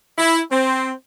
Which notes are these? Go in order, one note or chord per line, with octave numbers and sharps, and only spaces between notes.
E4
C4